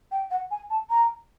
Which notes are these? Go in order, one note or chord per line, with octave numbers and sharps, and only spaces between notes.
G5
F#5
G#5
A5
A#5